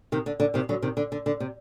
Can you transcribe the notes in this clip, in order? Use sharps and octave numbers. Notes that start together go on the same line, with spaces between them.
C3 D#3
D3
D3
C3 D#3
D3 F#3
C3 D#3
D3
D3
D3
C3